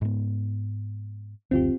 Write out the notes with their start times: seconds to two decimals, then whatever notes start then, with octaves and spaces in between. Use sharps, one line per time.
0.01 G#2 B3
1.51 F#1 D2 C4 F4 G4